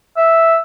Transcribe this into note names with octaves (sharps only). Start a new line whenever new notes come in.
E5